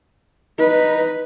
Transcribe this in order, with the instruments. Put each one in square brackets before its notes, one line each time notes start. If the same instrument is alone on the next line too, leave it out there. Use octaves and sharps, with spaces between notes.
[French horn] D#4 [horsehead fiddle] B4